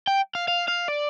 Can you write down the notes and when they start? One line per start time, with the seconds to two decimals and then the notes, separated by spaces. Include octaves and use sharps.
0.08 G5
0.35 F5
0.48 F5
0.68 F5
0.88 D5